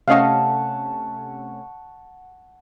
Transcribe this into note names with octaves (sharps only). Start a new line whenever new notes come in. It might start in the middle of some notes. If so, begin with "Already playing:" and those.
C3 A3 C#4 D#5 F5 F#5 A5 C#6